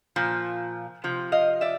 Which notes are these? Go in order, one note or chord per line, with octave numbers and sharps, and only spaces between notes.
A#2 F3
C3 F3
D#5 F5
D5 E5